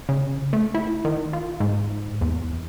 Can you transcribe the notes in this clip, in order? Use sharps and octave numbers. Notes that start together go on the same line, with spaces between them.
C#3
A3
E4
D#3
F4
G#2
E2